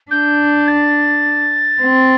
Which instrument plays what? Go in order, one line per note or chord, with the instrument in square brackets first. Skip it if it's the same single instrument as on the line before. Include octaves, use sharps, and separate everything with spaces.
[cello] D4 [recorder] G6
[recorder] A6
[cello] C4